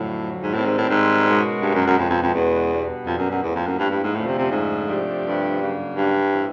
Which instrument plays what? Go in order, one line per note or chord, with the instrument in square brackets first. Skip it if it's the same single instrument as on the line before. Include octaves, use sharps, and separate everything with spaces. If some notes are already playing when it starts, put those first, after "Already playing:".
Already playing: [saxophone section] F2 D3 F#3 [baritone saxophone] A2
[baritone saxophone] G#2
[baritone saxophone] A2 [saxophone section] D#3 G3 C4
[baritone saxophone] G#2
A2
G#2
[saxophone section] B2 G#3 C#4 F#4 A#4
[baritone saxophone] G2
F#2
F#2
[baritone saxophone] F2 [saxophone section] B2 G#3 C#4 F#4 B4
[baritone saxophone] F2
F2
E2
[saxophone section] B2 G3 B3 D4 F#4
[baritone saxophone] F2
F#2
F#2
[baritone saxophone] E2 [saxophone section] A2 F3 A#3
[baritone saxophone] F2
F#2
G2
G2
G#2
[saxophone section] F2 D3 F3 A3 C#4 [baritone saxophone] A2
[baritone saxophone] C3
C3
G#2
[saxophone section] C3 F3 A3 D4 G4
[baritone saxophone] G2
[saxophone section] C#3 F#3 A#3 D4
[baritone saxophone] G2
[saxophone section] A2 E3 G3 C4 E4